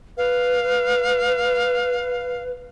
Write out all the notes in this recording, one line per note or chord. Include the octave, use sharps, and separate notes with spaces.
B4 F5